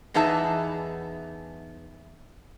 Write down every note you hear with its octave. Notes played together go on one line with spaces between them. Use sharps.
E2 B3 D#4 G#4 E5 A5